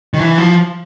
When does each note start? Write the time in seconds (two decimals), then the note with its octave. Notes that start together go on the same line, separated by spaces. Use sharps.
0.14 D#3
0.19 E3
0.38 F3